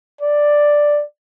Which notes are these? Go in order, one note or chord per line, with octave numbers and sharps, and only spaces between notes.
D5